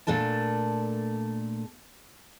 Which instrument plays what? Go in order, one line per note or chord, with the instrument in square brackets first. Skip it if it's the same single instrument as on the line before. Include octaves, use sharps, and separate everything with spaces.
[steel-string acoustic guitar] A#2 A3 D4 A4 A5